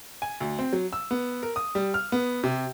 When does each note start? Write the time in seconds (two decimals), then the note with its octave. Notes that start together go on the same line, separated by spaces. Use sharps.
0.22 G#5
0.40 D2
0.59 C4
0.73 F#3
0.93 E6
1.11 B3
1.43 A#4
1.56 D#6
1.75 G3
1.94 F6
2.12 B3
2.43 C3